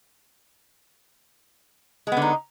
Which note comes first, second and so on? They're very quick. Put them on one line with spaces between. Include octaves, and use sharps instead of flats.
G#3 B3 D3 D#4